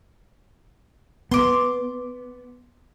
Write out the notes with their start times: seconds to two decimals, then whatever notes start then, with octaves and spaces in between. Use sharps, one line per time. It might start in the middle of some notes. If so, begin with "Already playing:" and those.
1.31 B3 C6 D6